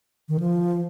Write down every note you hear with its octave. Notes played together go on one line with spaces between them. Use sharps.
D#3
F3